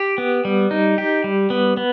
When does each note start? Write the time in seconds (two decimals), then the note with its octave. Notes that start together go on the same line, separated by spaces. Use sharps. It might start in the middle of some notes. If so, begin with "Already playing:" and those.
Already playing: G4
0.18 B3
0.45 G3
0.71 D#4
0.98 G4
1.24 G3
1.50 B3
1.77 B3